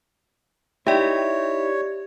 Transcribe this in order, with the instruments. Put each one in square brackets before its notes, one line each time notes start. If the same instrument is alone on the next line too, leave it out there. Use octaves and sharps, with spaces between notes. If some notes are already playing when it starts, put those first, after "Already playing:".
[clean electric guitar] D#4 E4 [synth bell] G4 D5 [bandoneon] C#5 [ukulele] E5 G5